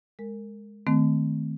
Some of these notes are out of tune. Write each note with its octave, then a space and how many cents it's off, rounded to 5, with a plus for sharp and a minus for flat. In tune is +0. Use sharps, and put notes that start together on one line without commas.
G#3 +0 A#4 -25
D#3 +0 A3 -10 C4 -30